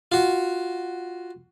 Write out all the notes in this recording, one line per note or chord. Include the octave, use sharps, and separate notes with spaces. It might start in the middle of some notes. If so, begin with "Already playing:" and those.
F4 F#4